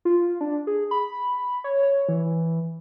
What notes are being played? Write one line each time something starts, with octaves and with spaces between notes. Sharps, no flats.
F4
D4
G#4
B5
C#5
C#5
E3